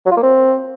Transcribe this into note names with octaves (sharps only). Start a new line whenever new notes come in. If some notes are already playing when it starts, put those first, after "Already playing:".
F#3
F4
A#3
C4